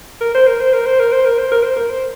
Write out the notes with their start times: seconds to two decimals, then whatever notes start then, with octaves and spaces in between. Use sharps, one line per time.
0.21 A#4
0.35 C5
0.47 A#4
0.60 C5
0.74 A#4
0.86 C5
1.00 A#4
1.12 C5
1.25 A#4
1.39 C5
1.52 A#4
1.63 C5
1.76 A#4
1.90 C5